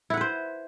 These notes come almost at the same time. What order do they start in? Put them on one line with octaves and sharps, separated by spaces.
E4 F#5 B4 C5